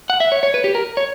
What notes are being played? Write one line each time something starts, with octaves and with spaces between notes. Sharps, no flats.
F#5
E5
C#5
C#5
B4
G4
A#4
C#5